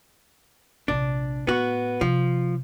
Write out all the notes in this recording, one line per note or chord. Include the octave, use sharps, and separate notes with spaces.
A#1 C3 D4
A2 B3 F#4
C3 F3